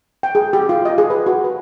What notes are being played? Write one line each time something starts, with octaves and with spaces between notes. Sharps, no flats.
G5
G#4
G4
F4
D#5
G#4
B4
F#4
B4